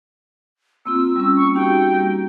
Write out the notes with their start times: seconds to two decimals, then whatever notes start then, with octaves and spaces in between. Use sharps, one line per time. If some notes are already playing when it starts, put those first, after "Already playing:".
0.86 A#3 C4 F4 E6
1.16 G3 C#4
1.37 A#3 C#6
1.55 D#4 F#4 G4 G5
1.91 G3 A#3